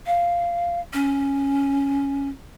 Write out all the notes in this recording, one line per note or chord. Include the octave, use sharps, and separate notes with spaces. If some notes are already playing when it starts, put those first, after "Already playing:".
F5
C#4